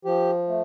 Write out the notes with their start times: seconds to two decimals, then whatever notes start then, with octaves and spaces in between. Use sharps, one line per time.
0.05 F3 G4
0.48 A3